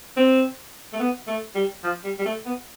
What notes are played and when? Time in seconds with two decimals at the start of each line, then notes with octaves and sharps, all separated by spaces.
0.17 C4
0.93 A3
1.00 B3
1.28 A3
1.55 G3
1.84 F3
2.04 G3
2.19 G3
2.26 A3
2.46 B3